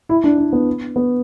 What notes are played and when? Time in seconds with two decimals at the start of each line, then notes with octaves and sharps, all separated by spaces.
0.09 E4
0.24 D4
0.38 D4
0.52 B3
0.96 B3